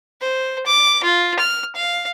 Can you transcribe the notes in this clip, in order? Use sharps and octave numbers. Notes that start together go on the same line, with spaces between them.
C5
D6
F4
F6
F5